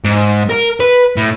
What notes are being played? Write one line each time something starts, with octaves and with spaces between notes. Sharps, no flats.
G#2
A#4
B4
A2